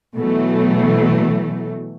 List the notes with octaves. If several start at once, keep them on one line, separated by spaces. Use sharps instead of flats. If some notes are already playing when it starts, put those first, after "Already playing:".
B2 E3 F#3 A3